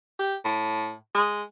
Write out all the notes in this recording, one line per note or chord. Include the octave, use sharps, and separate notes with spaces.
G4
A2
G#3